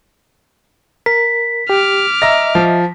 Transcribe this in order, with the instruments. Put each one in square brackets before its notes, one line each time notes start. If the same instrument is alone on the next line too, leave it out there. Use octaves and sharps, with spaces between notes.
[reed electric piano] A#4 [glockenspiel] B6
[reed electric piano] G4 [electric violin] D6 F6
[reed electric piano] D#5 E5 [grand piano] A#5 A#6
[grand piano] F3